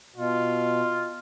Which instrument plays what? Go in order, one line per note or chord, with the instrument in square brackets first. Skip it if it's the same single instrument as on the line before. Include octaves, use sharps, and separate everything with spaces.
[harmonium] B2 [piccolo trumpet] F4